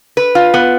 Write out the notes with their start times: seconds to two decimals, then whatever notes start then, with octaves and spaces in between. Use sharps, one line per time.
0.17 B4
0.35 F4
0.54 B3